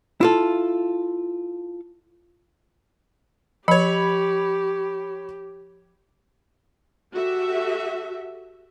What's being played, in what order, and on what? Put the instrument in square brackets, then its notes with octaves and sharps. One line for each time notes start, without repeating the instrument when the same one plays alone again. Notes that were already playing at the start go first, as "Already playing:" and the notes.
[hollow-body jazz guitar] E4 F4 A4
[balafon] F3 [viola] G4 [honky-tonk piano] C#5 B5
[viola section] F#4 G4 A4 E5